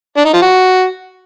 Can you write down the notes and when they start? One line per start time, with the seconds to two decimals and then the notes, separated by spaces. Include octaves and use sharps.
0.17 D4
0.25 D#4
0.34 F3
0.42 F#4